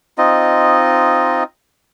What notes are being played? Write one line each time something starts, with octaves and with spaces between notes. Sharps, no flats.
C4 D#4 F4 D#5